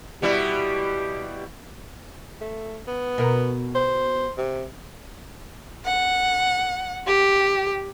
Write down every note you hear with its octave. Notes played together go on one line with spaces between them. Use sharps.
B2 G3 E4 G4
A3
B3
B2 A#4
C5
C3
F#5
G4